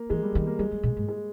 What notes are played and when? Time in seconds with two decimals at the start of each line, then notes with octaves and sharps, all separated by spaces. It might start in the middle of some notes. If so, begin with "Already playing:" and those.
Already playing: A#3
0.10 E3 G#3
0.23 G3
0.34 D#3 G#3
0.47 A#3
0.59 G3 G#3
0.71 G3
0.83 A#2
0.97 G#2
1.09 G#3